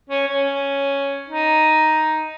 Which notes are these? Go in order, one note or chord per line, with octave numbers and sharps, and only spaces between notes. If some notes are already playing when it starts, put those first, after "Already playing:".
C#4
C#4
D#4